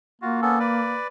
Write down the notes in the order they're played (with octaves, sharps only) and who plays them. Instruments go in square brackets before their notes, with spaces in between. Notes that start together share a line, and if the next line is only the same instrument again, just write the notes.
[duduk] A#3 [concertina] F4 F#4
[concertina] B3 C#4 A4
B4 D5